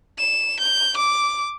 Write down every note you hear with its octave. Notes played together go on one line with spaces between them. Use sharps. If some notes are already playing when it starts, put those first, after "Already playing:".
E7
G6
D6